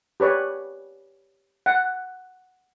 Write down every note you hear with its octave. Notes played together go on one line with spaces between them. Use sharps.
G4 B4 C#5 D5
F#5